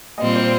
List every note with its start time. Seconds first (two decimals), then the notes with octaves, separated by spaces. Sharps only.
0.18 A#2 G3 C4 F4 D#5
0.35 C5